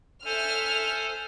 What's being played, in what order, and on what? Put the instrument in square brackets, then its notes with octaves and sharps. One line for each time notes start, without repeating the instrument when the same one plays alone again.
[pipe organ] A4 C5 G#5 [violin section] E5 F6